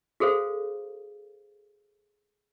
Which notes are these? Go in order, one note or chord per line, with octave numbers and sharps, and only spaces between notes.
F#4 G#4 A4 C5 F5